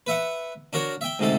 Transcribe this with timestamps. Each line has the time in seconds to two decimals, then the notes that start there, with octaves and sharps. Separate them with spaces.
0.07 B4 E5 F#5
0.73 D4 F#4 A#4 C#5
1.01 E5 G5
1.19 D2 G#2 C3 A4 A5